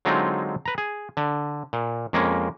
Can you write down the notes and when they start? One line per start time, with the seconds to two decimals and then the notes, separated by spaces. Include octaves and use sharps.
0.05 D3 F#3 G#3 C4 D#4 F4
0.66 B4 A#5
0.78 G#4
1.17 D3
1.73 A#2
2.13 F2 G#3 A#3 C#4